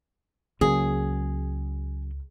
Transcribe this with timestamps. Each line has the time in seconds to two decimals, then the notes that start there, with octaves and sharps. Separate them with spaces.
0.61 C#2 C#3 F#3 A#3 G#4